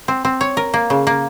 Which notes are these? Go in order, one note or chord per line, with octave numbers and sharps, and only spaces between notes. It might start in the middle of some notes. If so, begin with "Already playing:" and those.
C4
C4
C#5
A#4
A#3
C#3
A#3